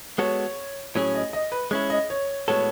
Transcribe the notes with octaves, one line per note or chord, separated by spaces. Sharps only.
G#3 B3 F#4 A4 C#5
A2 F#3 C#4 G#4 C#5
D#5
D#5
B4
G#3 C#4 E4 C#5
D#5
C#5
A2 G#3 B3 F#4 A4 C#5